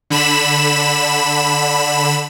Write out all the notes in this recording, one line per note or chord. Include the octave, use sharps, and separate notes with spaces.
D3 B5 E7